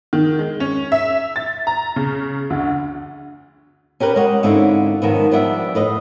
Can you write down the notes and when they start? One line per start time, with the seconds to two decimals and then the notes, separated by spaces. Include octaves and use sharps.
0.13 D#3
0.39 G#3
0.60 C#4
0.92 E5
1.36 A6
1.67 A#5
1.96 C#3
2.50 D2
4.00 C#4 G4 A#4 B4
4.16 G#3 G4 C#5 F#5
4.43 G#2 D3 C4 C#4 E4 F4
5.02 G#2 D#3 F3 B3
5.31 F3 G3 B3 D4 C#5 E5
5.75 A2 B4 D#5